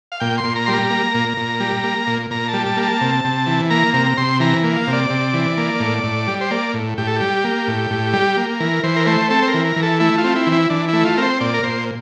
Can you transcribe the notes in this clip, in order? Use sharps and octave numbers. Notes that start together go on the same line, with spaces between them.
F5
A#2 G5
C6
A#2
A#5
G3 C6
A#5
A#3
A#2
A#2
G3
A#3
A#2
A#2 A#5
A5
G3
A5
A#3
A5
C3
C3
E3
A#3 A#5
C3 A#5
A#5
C3 C6
E3 A#5
A#3
F5
C3
D5
C3
E3
A#3
A2
A2
G3
C5
A#3 D5
A2
A2 G4
A4
G3 G4
A#3
A2
A2
G3
A#3
E3 A#4
E3 C5
A#4
A3 C5
C4 A4
C5
A#4
E3
A#4
E3
A4
A3 E4
F4
C4
E4
E3
E4
E3 D4
A3 E4
F4
C4 A#4
C5
A#2 D5
A#4
A#2 C5